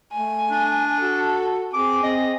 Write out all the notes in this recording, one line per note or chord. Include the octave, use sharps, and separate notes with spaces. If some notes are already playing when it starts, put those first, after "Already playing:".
A3 G#5
D4
F#4 A4
C4 G#4 D6
C4 D#5